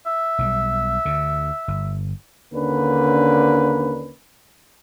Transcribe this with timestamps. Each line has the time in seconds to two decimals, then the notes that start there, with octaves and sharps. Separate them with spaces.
0.07 E5
0.38 B1 D#3 G3
1.05 D2 D3
1.68 G1
2.53 D#2 D3 A#3 C#4 D4 B4